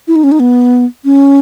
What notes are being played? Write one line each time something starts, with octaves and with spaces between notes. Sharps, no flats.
E4
D#4
C#4
D#4
B3
C#4